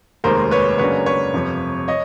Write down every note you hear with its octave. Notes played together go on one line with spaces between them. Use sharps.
F1 D#2 D#3 G#3 A#4 C5
B4 C#5
F#2 C#3 F#3 A#3 D4 B4 C#5
B4 C#5
G1 F2 C3 F3
C#5 D#5